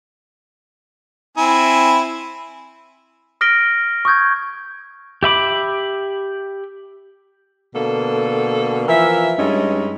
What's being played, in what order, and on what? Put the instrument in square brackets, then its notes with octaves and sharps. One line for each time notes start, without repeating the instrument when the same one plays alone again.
[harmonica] C4 E4 G#5
[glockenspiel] D#6 F6 A#6 B6 D7 G7
C#6 D#6 G6 G#6
[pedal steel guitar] G4 E5 B5 D6
[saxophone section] B2 D3 A#3 A4
E3 F3 A#4 E5
G2 G#3 C#4 D#4